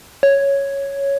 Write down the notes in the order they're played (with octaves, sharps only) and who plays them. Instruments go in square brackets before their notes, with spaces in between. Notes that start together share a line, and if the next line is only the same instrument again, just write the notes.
[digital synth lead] C#5